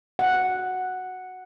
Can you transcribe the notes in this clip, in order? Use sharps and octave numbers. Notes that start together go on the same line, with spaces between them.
F#5